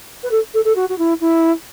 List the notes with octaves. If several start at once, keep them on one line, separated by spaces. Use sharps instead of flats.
B4
A4
A4
A4
F#4
F#4
E4
E4